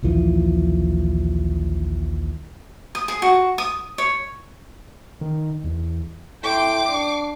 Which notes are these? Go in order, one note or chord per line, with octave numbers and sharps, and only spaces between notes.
A#1 D#2 E3 F3
D#6
G#4
F#4
D#6
C#5
D#3
E2
A2 G5 C6 D6
D4 C7